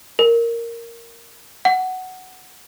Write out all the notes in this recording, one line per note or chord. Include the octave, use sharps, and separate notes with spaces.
A#4
F#5